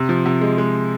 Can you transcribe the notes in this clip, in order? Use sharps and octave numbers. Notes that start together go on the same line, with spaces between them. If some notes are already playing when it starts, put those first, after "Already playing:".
Already playing: C3
F3
C3
G#3
G#3